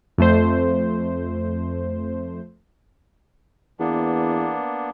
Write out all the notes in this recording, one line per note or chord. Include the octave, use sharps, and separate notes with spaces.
F2 A3 C5
E2 A#3 B3 D4